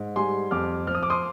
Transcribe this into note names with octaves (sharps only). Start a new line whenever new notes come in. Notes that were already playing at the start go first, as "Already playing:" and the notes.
Already playing: G#2
G3 G#5 C6
F2 D6 F6
F3 F6
D#6
D6
C6 D#6